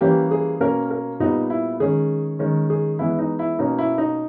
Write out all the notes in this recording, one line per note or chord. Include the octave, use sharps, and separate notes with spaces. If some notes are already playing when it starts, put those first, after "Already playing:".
E3 G3 A#3 C#4 G4
G#4
B2 A#3 C#4 A#4
A#4
A#2 G3 B3 D#4
E4
D#3 G#3 C#4 G#4
D#3 G#3 C#4
G#4
E3 G#3 B3 E4
D#4
E4
B2 A#3 C#4 D#4
E4
D#4